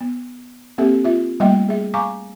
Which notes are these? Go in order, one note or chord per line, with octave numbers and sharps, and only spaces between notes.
B3
A#3 C4 G4 A4 E5
F4 E5
G3 A3 A#3 D#5 E5 G5
G#4 E5
F5 G#5 A#5 C#6 D6